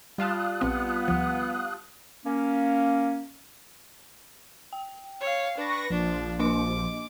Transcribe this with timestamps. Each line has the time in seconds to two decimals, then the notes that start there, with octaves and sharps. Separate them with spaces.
0.18 G3 F4 F5 A5 D#6 F#6
0.61 A#1 B3 C4
1.08 D2 F3
2.26 A#3 C#4
4.73 G5
5.21 C#5 F5
5.58 D4 B4 C#6 A#6
5.90 A#1 F3 D4
6.39 A#3 D4 D#5 D6